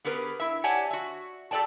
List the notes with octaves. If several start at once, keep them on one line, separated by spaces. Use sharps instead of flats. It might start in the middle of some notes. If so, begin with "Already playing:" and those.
B3 G4 G#4 A#4 B4
E4 E5
G4 C#5 D5 F#5 G#5 A5
F#4 E5
G4 A4 C5 D5 G5 A5